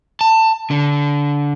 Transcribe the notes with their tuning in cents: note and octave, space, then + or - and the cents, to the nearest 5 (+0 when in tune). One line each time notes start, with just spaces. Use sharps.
A5 +20
D3 -20